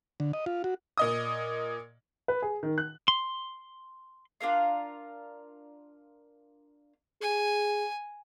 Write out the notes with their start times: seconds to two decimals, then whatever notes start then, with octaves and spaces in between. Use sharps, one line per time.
0.20 D3
0.33 D#5
0.46 F4
0.64 F#4
0.98 A#2 D#5 D#6
2.28 B4
2.42 G#4
2.63 D#3
2.78 F#6
3.08 C6
4.40 D4 F4 A#4 F5
7.22 G#4 G#5